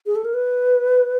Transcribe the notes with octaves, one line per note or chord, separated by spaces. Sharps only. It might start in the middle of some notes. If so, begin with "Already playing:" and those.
G#4
A4
A#4
B4